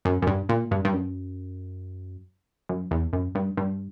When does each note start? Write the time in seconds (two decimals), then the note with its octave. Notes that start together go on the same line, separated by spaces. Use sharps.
0.05 F#2
0.22 F#2
0.27 G2
0.49 A#2
0.71 G2
0.85 G2
0.93 F#2
2.69 F#2
2.91 E2
3.13 F#2
3.35 G2
3.57 G2